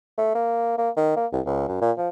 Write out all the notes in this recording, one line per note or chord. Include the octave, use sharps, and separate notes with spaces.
A3
A#3
A#3
D#3
A#3
C2
C#2
F#2
A#2
F3